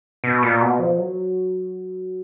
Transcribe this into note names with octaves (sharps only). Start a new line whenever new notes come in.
B2
A#2
B2
F3
F#3